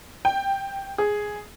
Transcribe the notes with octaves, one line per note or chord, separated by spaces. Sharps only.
G5
G#4